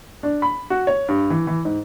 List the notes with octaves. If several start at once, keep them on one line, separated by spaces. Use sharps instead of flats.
D4
B5
F#4
C#5
G2
E3
E3
G#2